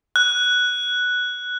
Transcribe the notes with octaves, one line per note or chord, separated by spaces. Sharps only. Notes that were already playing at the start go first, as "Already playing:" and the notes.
F#6